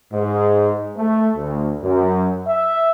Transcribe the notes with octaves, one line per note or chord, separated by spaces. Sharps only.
G#2
A3
D2
F#2
E5